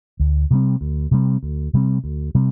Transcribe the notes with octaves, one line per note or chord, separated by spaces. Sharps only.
D2
C3 G3 C4
D2
C3 G3 C4
D2
C3 G3 C4
D2
C3 G3 C4